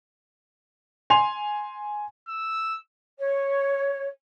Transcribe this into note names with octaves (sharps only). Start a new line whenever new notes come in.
G#5 C6 F7
E6
C#5